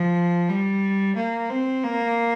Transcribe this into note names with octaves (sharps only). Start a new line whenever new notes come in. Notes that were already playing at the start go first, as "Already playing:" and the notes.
Already playing: F3
G3
A#3
C4
A#3